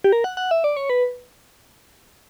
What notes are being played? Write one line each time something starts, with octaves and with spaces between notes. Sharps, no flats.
G4
A#4
F#5
F#5
E5
D5
C#5
B4